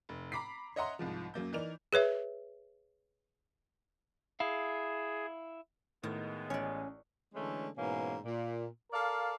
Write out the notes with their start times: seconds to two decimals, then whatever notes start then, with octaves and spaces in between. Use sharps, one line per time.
0.09 F1
0.32 A#5 B5 D6 B6 C7
0.76 C#5 D#5 E5 F#5 A#5 C6
0.99 C2 G#2 F3
1.34 F#2 F#3 A#3 G6
1.53 E3 D#4 A#4 D5 F7
1.93 G#4 B4 C#5 E5
4.40 E4 G#4 F5
6.03 A2 D#3 G#3 B3
6.50 A1 C#4 C#5 D5
7.34 D3 E3 G#3 A3 C#4
7.77 G#2 B2 E3 A#3 C#4
8.25 A#2
8.92 A4 A#4 D5 F5